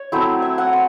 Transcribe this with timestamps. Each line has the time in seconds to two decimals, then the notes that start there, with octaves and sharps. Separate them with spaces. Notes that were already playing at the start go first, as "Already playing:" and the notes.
Already playing: C#5
0.12 F#3 A3 C4 E4
0.42 E5
0.58 F#5
0.73 C6